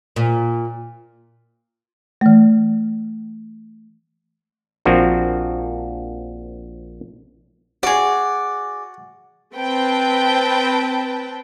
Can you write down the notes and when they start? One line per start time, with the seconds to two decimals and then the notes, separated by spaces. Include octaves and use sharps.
0.16 A#2
2.21 E3 A3
4.85 A#1 F3 A#3 C4 D4 F#4
7.83 F#4 G#4 D5
9.54 C4 B4 G5 A5